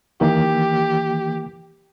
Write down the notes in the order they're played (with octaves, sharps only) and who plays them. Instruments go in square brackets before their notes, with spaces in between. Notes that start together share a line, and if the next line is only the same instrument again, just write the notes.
[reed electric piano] D#3 E3 A#3 [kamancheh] G4